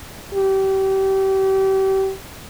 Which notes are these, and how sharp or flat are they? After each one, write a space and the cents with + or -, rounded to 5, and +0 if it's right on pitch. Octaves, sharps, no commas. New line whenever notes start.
G4 -30